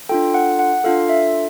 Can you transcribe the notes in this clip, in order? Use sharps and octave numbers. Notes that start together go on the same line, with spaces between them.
D4 F4 A4 G5
F#5
F#5
D4 F4 A4 F5
E5